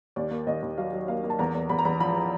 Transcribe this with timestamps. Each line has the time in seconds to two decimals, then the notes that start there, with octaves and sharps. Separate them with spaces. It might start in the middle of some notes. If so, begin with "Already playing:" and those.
0.16 D#2 D5
0.31 A#3
0.47 D#2 D#5
0.62 D#2
0.78 F#3 F5
0.93 F#3
1.08 A#3 F5
1.24 A#3
1.30 A5
1.39 E2 A#5
1.55 E2
1.69 E2 B5
1.79 A#5
1.85 E2 B5
2.00 F3 B5